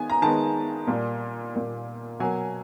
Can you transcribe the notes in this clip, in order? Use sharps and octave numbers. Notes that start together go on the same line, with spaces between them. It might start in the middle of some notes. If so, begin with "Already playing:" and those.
Already playing: D#3 G#3 B3 G#5
A#5
D#3 G#3 B3 A5
A#2 G3 A#3
A#2 G3 A#3
B2 F#3 A#3 G#5